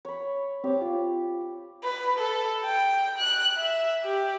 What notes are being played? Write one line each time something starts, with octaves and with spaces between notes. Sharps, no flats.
C#5 B5
C4 G4 C#5 D6
F4
B4
A4
G5
F#6
E5
G4